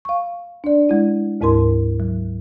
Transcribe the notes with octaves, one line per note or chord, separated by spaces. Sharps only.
F5 C#6
D4 D5
G#3 E4
D2 G#2 E4 A#4 C6
F#3